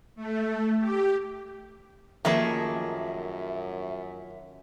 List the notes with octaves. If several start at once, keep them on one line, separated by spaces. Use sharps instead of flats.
A3
G4
F#2 D#3 F3 A3 A#3 G#4 E5